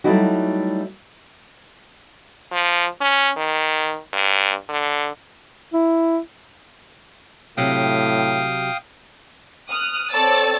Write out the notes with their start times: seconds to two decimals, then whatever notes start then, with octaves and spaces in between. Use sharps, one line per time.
0.04 F#3 G3 A3 D#4 E4 F#4
2.52 F3
3.01 C#4
3.37 D#3
4.13 G2
4.69 D3
5.74 E4
7.57 A2 C3 F#3 G4 F5 G5 D#6
9.70 D#6 F6 F#6
10.12 C4 A4 C#5 D5 E6 A6